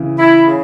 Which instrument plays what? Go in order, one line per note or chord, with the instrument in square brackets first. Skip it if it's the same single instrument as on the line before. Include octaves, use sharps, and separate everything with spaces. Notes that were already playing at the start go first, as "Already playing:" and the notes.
Already playing: [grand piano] C#3 E3
[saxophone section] E4
C#3